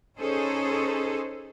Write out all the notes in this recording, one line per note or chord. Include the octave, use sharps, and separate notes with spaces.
C#4 D#4 G#4 A4 C5 C#5